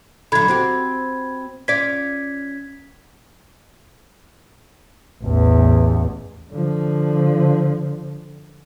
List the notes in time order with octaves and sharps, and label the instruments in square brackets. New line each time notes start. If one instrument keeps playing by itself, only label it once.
[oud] D3 F#3 [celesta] B5 G#6
[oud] C4 F#4 G4
[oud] C#4 F4 D5 [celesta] G#6 B6
[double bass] A1 E2
D3 F3